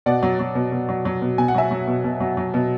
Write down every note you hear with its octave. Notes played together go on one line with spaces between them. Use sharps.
B2 D5 F#5
F#3
F#3
B2
B2
F#3
F#3
B2
B2 G#5
F#5
F#3 E5 G#5
F#3
B2
B2
F#3
F#3
B2